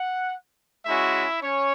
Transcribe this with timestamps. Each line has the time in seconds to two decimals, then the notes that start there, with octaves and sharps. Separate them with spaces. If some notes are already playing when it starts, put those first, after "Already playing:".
Already playing: F#5
0.86 G#3 C#4 E4 F#4 E5
1.42 C#4 C#5